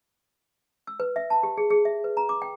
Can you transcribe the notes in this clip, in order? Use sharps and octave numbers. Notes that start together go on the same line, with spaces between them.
E6
B4
E5
A5
G4
G#4
G#4
E5
B4
A#5
D6
G5